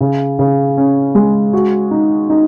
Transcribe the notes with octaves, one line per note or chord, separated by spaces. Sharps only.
C#3
C#3
C#4
G#3
F#4
D#4
D#4